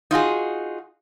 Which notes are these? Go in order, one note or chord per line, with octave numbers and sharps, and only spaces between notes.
D#4 F4 F#4 G#4